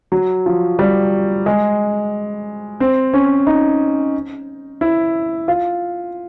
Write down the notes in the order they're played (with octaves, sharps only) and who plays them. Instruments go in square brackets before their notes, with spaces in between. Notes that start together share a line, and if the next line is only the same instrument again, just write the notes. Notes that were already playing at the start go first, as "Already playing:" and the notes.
[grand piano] F#3
F3
G3
G#3
C4
C#4
D#4
E4
F4